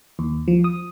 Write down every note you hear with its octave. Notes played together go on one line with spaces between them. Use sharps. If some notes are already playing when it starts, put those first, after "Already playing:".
D#2
F3
D#6